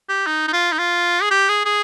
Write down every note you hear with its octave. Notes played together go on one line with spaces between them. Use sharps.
G4
D#4
D#4
F4
D#4
F4
G#4
G4
G#4
G#4